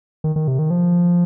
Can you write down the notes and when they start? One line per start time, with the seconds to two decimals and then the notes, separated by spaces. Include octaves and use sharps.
0.24 D#3
0.36 D#3
0.48 C3
0.59 D#3
0.70 F3